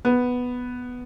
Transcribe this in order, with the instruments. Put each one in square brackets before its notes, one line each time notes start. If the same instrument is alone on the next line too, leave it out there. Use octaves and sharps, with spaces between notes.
[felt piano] B3